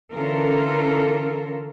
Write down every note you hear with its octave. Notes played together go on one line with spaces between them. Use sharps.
D3 E3 C#4 F4 A4 A#4